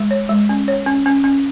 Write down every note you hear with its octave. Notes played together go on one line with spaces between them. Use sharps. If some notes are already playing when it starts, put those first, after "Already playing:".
Already playing: G#3
C#5
G#3
C#4
C#5
C#4
C#4
C#4